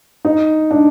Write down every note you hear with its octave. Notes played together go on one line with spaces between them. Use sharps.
D#4
D4